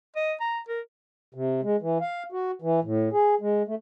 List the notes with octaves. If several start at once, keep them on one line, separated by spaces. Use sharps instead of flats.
D#5
A#5
A#4
C3
G#3
E3
F5
F#4
E3
A2
G#4
G#3
A3